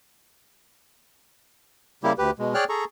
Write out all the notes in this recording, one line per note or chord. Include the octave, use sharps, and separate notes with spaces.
C#3 G3 A#3 E4 G4
D2 G4 B4
B2 G#3
G#4 C#5 D5 G5 F6 F#6
G#4 A4 A#5 C#6